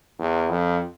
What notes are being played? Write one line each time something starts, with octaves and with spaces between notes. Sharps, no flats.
E2
F2